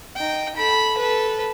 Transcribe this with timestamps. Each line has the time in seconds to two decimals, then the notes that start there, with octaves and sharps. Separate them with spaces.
0.16 D#4 G5
0.56 A4 B5
0.98 A4 B4